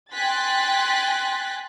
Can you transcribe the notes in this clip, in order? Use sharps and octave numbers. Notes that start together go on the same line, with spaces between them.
G5 G#5 C6 F#6 A6 B6